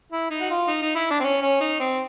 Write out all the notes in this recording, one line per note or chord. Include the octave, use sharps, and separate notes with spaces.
E4
D#4
F#4
F4
D#4
D#4
E4
D4
C4
C#4
C#4
D#4
C4